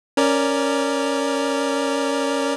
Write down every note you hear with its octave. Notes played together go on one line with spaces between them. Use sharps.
C#4 A#4 D5